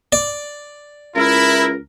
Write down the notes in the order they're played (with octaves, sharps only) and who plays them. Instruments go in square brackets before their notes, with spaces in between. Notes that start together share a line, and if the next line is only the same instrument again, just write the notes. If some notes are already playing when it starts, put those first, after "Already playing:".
[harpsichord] D5
[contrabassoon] C#2 [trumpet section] E4 [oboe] A#4